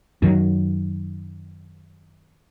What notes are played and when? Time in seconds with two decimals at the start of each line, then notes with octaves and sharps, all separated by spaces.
0.22 F#2 D#3 F#3